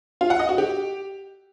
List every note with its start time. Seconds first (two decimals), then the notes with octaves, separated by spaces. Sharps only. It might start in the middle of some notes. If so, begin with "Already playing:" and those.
0.21 F4
0.30 F#5
0.40 D#5
0.49 F#4
0.58 G4